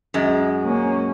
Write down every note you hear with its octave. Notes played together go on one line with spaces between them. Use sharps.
F#2 G#3
A#3 C#4